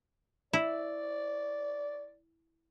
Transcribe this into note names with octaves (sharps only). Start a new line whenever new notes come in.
E4 D5